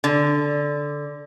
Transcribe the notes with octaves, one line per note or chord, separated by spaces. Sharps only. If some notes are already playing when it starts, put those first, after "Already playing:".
D3